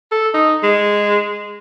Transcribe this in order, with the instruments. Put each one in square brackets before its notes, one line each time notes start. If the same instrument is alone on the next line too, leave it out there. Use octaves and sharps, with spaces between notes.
[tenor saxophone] A4
D#4
G#3